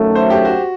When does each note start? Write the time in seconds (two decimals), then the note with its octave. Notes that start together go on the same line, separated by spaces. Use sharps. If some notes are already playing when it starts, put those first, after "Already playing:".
Already playing: F#2 D#3 F#3 A3
0.15 C5
0.30 G4
0.45 F#4